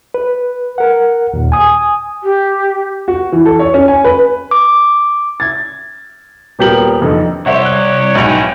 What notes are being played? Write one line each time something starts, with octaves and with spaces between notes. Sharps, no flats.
B4
A#4 F#5
D#2 A#2
G#5 D#6
G4
F#4
E3
A4
C#5
C#4
G#5
B4
D6
G#6 A6
D#1 B3 G4 A#4 F#7
F2 D3 D#4
C2 G4 C5 C#5 E5 F#5
F#6
B1 G#2 C#4 E4 F7
G5